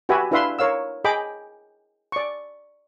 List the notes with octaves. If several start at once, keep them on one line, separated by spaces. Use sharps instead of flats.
F#4 G4 B4 E5 G#5
D4 E4 B4 E5 F5 C6
A#4 C#5 F5 E6
G#4 D#5 G5 B5 D6
D5 C#6